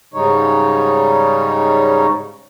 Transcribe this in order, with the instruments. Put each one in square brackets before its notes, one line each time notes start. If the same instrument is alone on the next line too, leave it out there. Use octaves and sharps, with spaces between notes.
[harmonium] G#2 C#3 G3 D#4 C#5